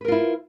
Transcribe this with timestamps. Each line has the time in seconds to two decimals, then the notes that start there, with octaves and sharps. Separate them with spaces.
0.01 B4
0.05 A#4
0.08 F4
0.12 E4